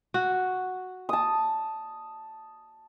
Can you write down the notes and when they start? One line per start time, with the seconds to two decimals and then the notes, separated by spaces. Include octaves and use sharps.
0.14 F#4
1.09 A5 D#6